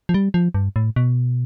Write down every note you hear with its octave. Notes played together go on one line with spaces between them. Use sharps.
F3
G3
F3
G2
A2
B2